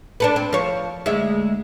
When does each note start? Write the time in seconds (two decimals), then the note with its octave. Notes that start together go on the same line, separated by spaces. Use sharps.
0.20 D4 A4 B4
0.36 C4
0.53 F3 C#5
1.06 D2 G#3 E5